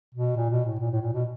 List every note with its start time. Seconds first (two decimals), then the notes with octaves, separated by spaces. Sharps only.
0.15 B2
0.37 A#2
0.51 B2
0.66 A2
0.80 A#2
0.91 A2
1.02 A#2
1.13 B2